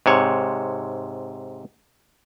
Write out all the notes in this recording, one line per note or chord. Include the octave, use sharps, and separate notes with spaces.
G#2 C3 C#5